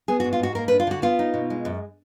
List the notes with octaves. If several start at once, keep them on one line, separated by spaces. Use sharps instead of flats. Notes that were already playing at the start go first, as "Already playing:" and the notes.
B3 G#4
F#4
G#2
F4
G#2 F#4
A#3 A#4
B4
D4
F4
D3 F#4
B3 F4
D#4
B2
G#3
F#2